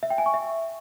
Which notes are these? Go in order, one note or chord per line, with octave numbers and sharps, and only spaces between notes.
E5
G5
G#5
C#6
E5